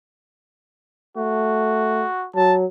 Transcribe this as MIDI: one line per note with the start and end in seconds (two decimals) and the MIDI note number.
1.17 2.05 57
1.17 2.26 66
2.36 2.66 54
2.36 2.56 81